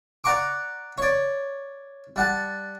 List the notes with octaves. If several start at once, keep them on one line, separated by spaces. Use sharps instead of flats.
D5 F#5 A#5 C#6 D6
C#5 D5
G3 F#5 A5